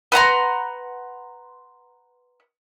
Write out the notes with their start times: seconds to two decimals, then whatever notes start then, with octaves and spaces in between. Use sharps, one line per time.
0.12 B4 F#5 A#5 C6